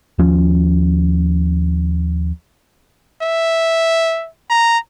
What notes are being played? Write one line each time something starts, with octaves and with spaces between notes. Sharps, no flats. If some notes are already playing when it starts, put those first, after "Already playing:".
D#2 F3 C#4
E5
A#5